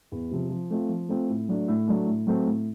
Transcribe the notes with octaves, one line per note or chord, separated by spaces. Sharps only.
E2
C3 F3
F3
A3 C4 F4
F3
A3 C4 F4
A2
F#3 A3 D4
A2
F#3 A3 D4
A2
F#3 A3 C4
A2